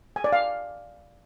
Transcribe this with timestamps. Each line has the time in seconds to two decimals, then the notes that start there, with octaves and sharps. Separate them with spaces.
0.16 G#5
0.24 D5
0.32 F5